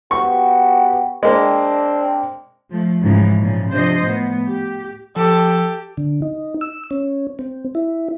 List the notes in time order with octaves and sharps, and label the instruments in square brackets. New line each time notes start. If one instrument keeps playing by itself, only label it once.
[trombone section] B3 F#4 G4 [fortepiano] C#6
[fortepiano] G#3 A#3 [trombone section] C4 D4
[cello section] F3 A3
G#2 C#3 E3 F3 A3
A#2 C#3 F3
C3 F3 D4 C5 D#5
A2 B3
G4
[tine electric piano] F3 [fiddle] G4 [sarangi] A4
[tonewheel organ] D3
D#4
E6
C#4
C4
E4